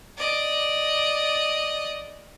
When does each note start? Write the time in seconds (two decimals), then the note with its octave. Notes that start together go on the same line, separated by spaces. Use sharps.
0.17 D5 D#5